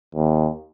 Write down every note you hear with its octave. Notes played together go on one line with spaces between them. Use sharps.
D#2